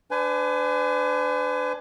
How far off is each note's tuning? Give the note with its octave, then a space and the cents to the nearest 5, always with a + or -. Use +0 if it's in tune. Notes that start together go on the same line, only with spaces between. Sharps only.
D4 +0 B4 +45 G#5 +10